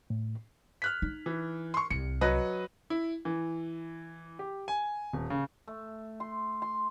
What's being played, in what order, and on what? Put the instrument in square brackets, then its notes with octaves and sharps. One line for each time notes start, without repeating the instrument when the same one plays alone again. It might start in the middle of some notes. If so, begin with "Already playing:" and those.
[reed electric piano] A2
[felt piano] F6 F#6 B6
[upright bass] D#4
[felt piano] E3
C6 C#6
[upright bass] C2 [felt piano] C#7
[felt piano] F#3 B4 D#5
[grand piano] E4
E3
G4
G#5
D#1
C#3
[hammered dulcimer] A3
C6
C6